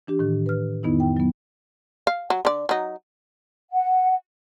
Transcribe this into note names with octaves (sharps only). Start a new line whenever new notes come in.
E3 D4 G4
A2 D#3
B4 F6
F2 D#3 B3 D#4 E4
G5
F#3 B3
F5
F#3
D3 D5
F#3 D#4
F#5